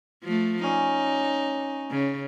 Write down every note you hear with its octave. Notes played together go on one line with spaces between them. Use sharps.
F3 A3
C#4 D#4 D5
C#3